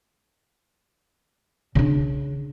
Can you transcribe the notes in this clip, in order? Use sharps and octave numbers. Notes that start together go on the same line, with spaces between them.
C#3 D4